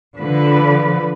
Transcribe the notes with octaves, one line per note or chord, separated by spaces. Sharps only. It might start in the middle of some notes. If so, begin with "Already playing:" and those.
D3 F3 B4